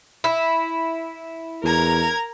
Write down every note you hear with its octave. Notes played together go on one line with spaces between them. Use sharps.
E4
E2 A#4 A#5 G#6